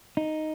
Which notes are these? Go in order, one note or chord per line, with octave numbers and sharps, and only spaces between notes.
D#4